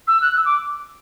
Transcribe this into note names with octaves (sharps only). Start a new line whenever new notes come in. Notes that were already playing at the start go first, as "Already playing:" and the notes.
E6
F#6
E6
D6